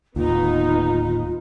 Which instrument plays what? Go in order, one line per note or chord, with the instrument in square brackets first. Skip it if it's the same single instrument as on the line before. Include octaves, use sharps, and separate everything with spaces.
[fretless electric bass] D1 D#2 [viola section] B3 D#4 [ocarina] F4